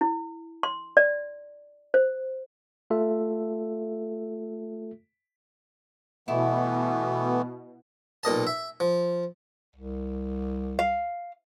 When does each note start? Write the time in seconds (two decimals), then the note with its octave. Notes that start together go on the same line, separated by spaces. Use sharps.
0.01 E4
0.63 C6
0.97 D5
1.94 C5
2.90 A3 F4 A4 E5
6.28 B2 E3 A3 B3 E4
8.23 B1 A#2 D#5 A5
8.47 E5
8.80 F3
9.76 C2
10.79 F5